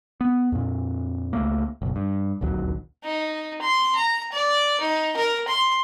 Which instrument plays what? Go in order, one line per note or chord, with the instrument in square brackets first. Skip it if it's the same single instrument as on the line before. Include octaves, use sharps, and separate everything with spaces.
[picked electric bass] B3
F2 A#2
C#2 A3 A#3
F#1 B1
G2
D1 A#1 D#2 F#3
[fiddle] D#4
C6
A#5
D5
D#4
A#4
C6